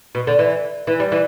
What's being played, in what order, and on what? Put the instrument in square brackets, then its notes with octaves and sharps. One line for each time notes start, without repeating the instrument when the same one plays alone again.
[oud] B2
D3
E3
E3
G3
E3